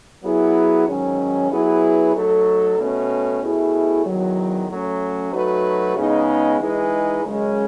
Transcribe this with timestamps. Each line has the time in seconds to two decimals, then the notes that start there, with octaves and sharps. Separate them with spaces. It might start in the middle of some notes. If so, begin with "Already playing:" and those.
0.24 F#3 B3 E4 G#4
0.87 G#2 D#3 F#3 C#4
1.51 F#3 B3 E4 G#4 B4
2.14 F#3 A3 D#4 A4
2.78 B2 A3 C#4
3.42 B2 A3 E4 G#4
4.06 E2 D#3 F#3
4.69 F#3 A3 C#4
5.33 F#3 A3 D#4 F#4 B4
5.96 C#3 G#3 B3 D#4
6.60 E3 G#3 D#4 G#4 B4
7.24 F#2 C#3 G#3 C#4